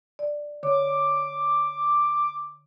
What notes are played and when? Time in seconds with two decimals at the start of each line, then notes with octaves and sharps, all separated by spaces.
0.19 D5
0.63 D3 C#5 D6